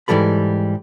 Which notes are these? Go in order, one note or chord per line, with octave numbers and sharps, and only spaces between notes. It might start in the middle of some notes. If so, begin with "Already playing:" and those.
G#2 E3 G3 A4 B5